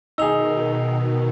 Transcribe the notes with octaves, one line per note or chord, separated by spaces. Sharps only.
B2 D#3 D#4 G#4 E6 F7